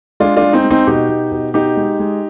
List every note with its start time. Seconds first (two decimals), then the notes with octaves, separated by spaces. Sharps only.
0.20 G#3 D4 F4
0.37 D4 F4
0.42 G#3
0.53 C4 D#4
0.64 G#3
0.71 C4 D#4
0.87 B2 D#4 G4
1.09 B2
1.32 B2
1.54 B2 D#4 G4
1.77 G#3
1.99 G#3